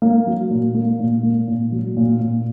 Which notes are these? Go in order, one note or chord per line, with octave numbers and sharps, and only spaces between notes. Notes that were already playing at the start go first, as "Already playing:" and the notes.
A#3
F#3
A#2
A#3
A#2
A#3
A#2
F#3
A#2
A#2